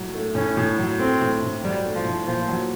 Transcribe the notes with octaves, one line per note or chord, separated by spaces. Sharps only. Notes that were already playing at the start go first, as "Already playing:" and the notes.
Already playing: A2 F#3
A3
A2 C#4
A2
F#3
A3 C4
A2
A2
F#3 G3
A3
F3
A2
A#2 F3
F#3